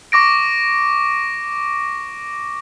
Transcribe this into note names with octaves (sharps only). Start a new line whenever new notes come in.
C#6 D6 A#6 D7